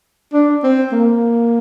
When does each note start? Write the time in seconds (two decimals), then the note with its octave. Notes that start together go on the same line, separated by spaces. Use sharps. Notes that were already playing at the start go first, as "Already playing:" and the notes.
0.33 D4
0.63 C4
0.92 A#3